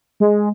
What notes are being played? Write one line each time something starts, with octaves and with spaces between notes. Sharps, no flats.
G#3